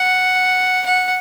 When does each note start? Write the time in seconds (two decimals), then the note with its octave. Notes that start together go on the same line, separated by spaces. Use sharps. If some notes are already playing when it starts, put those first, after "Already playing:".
Already playing: F#5
0.86 F#5